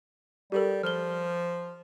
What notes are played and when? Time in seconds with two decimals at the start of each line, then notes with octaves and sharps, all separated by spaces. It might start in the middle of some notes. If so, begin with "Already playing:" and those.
0.52 G3 G4 A4 A#4
0.83 F3 F6 G7